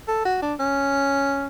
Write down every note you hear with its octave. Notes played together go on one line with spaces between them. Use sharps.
A4
F#4
D4
C#4